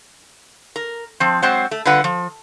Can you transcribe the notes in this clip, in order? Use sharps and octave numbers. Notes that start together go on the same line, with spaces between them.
A#4
F3 C4
F#3 G#3 C4 C5 F#5
A3
D3 G3 F4 B4 F#5
F3